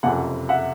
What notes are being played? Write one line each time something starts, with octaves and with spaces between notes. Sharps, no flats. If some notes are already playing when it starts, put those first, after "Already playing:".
F#1 F2 C3 F#5 G#5
E5 F#5